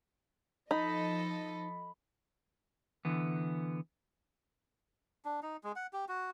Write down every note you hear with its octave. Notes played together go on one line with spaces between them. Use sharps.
F3 D#4 A4 D#5 B5
D3 E3 B3
D4
D#4
G#3
F#5
G4
F#4